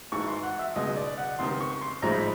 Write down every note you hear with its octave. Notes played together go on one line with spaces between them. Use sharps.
G#1 G#2 E3 C#6
C6
F#5
E5
C#2 B2 G#3 D#5
D5
F#5
C#2 C3 D#3 C6
C#6
C6
A1 G#2 F3 G#3 A#5
B5